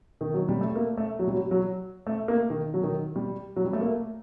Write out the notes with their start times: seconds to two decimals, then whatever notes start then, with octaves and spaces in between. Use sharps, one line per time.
0.21 D#3
0.34 F#3
0.49 G3
0.61 A3
0.75 A#3
0.97 A3
1.19 F#3
1.28 G3
1.34 F#3
1.51 F#3
2.07 A3
2.28 A#3
2.50 D#3
2.74 F#3
2.83 D#3
3.16 G3
3.56 F#3
3.65 G3
3.73 A3
3.81 A#3